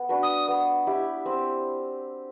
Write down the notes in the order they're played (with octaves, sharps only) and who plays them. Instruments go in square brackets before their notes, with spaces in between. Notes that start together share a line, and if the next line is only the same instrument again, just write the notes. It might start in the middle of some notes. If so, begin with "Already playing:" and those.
Already playing: [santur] B3
D4 F#4 B4
[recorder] D#6
[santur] B3
E4 G4
C4